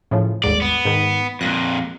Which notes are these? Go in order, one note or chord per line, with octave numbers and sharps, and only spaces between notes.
A2 C#3 F3
G1 D#2 G#2 D5
B3
G#2 D#3
F2 A#2 F#6 A#6